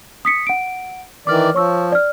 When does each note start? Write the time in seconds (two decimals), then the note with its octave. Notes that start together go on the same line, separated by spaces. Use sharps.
0.25 D#6 B6 C#7
0.47 F#5 D7
1.27 D#3 E3 D5 D6 F6
1.54 F3 C#5 C#6 E6
1.92 D5 F6